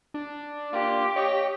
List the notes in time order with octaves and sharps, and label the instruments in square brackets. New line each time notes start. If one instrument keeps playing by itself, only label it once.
[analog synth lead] D4
[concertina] A#3 F4 [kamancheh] G4
[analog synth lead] C#5 [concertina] D#5 G5